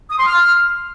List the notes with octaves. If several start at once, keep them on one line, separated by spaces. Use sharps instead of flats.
D#6
C6
F6